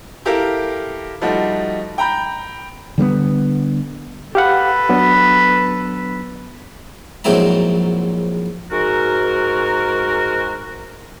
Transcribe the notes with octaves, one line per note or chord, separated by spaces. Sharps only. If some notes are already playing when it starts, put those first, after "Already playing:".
E4 G4 A4 A#4 F5
F3 G3 A3 D#4 F#4
G5 A#5 B5 G6
D3 G3 A#3 B3
G4 A4 B4 F5 F#5
F#3 B3 D4
A#1 G#2 F#3 C4 E4 A#5
G#2 F#4 A#4